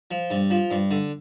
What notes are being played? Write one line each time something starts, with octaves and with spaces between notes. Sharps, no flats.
F3
G2
F3
G2
D3